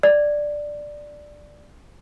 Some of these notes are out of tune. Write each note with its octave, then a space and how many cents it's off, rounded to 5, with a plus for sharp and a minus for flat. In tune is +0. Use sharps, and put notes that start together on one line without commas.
D5 +5